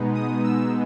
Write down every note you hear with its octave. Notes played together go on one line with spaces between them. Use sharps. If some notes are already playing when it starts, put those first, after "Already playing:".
Already playing: B2 G#3 B3 D#4
D#6
E6